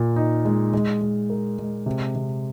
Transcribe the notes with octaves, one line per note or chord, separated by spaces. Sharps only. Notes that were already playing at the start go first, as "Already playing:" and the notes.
Already playing: A#2 A#4
D#4
G#3
G#3
G#3
A#4
G#3
C3
C3